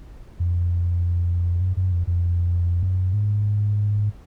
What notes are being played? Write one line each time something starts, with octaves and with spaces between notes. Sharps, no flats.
F2
F#2
F#2
F2
F2
F#2
G#2